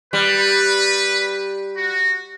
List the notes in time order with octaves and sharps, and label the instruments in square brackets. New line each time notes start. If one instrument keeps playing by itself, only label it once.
[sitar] G3 [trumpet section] B4
[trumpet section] F#4